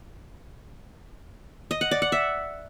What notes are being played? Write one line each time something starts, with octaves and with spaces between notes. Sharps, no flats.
D#5
F#5
D5
F#5
E5